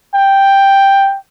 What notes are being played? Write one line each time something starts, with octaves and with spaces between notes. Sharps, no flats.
G5